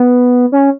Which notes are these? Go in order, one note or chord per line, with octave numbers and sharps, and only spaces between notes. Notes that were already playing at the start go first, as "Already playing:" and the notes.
Already playing: B3
C#4